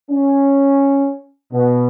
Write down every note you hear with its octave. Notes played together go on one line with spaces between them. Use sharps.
C#4
B2